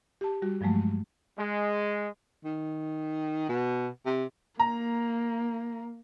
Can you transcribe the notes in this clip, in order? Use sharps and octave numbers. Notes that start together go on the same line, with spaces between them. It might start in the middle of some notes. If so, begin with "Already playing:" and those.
G4 A5
G3 F#4
G2 F3 F#3 G#3 A3
G#3
D#3
B2
C3
A#3 A#5